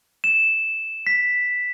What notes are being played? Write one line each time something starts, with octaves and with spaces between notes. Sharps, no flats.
E7
B6